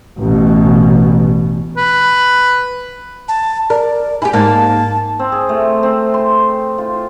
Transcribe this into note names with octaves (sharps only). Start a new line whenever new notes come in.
A1 B2
B4
A5
A#4 D5
E4 G4 G#5
G#2 A#3 A5
C4
G#4
A3
C4
C6
F4